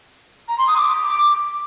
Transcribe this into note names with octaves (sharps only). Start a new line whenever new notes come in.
A#5
C6
D#6
D6